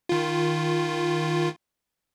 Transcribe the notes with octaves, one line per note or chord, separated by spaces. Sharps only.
D#3 F4